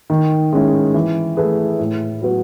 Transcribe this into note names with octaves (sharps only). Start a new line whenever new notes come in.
D#3
G#3 C#4 E4
E3
A3 E4 G#4 B4
A2
F#3 B3 F#4 B4